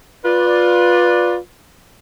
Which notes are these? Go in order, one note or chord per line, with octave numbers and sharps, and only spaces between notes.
F4 B4 D5